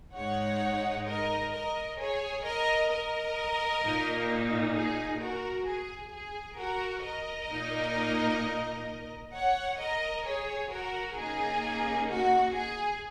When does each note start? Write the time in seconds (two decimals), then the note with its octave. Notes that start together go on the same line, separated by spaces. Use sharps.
0.15 G#2 G#3 D#4 C#5 F#5
1.07 A#4 D#5
1.53 A#4 D#5
1.99 G#4 C#5
2.45 A#4 D#5
2.91 A#4 D#5
3.83 A#2 A#3 D#4
4.75 G#4
5.21 F#4 A#4
5.67 G#4
6.13 G#4
6.59 F#4 A#4
7.05 A#4 D#5
7.50 A#2 A#3 D#4
9.34 C#5 F#5
9.80 A#4 D#5
10.27 G#4 C#5
10.72 F#4 A#4
11.18 C#3 A#3 D#4 G#4
12.10 F#4
12.56 G#4